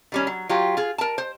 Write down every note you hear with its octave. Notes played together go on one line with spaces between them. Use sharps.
D#3 G3 C#4
F#3
F#3 F4 G4
F4 G#4
A#4 A5
C5